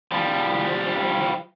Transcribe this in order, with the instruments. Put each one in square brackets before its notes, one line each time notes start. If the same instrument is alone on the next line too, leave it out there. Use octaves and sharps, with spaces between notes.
[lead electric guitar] F3 G3